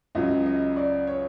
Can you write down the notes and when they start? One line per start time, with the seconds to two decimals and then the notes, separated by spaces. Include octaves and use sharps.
0.15 C#2 C#3 F#3 D#5
0.46 D#5
0.76 D5
1.07 C#5